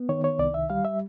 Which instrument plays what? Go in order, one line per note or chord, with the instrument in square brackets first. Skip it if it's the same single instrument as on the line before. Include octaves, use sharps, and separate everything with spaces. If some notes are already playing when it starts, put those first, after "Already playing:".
Already playing: [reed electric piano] B3
D#3 C#5
C#5
C2 D5
E5
G3 F5
E5